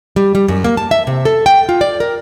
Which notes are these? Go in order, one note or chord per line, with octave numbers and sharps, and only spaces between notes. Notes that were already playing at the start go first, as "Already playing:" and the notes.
G3
G3
F#2
A#3
A5
E5
C3
A4
G5
F4
D5
A#4